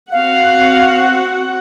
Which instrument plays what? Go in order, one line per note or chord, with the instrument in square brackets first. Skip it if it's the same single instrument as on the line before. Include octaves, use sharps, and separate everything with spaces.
[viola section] C4 F#4 F#5 [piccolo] F5